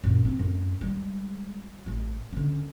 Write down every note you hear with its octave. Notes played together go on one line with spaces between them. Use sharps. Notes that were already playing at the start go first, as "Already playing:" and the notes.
F#2 A#2
E3 C4
F#2 A2
G3 G#3
A1 A3
D3 C#4